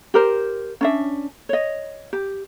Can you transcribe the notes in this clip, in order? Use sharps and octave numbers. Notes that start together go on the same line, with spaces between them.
G4 A#4 C5
C#4 D4 E5
C#5 D#5
G4